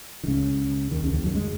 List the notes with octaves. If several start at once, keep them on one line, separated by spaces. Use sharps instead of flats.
D#3
C#2 C#3
D#2 D#3
C#2 C#3
D#2 D#3
F#2 F#3
G#3